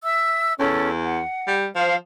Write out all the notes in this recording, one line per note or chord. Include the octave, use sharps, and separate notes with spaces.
E5 E6
E2 C#4 A4
F#5
G3
F3 C5 F5